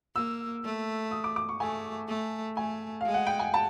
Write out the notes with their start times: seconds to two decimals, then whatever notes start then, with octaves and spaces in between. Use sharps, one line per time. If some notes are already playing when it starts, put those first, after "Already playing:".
0.15 A#3 E6
0.64 A3
1.11 D#6
1.24 D6
1.36 D6
1.49 C#6
1.60 A3 G#5
2.08 A3
2.57 A3 G#5
3.01 G#3 F5
3.14 F#5
3.27 G5
3.39 G#5
3.54 A5